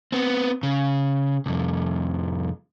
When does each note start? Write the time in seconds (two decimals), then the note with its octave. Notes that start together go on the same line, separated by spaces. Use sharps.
0.12 B3 C4
0.63 C#3
1.46 C2 F2